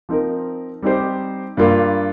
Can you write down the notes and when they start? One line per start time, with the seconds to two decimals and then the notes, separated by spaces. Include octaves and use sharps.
0.09 F3 C4 D#4 A#4
0.82 G3 C4 D#4 G4 C5
1.57 G2 G3 A#3 F4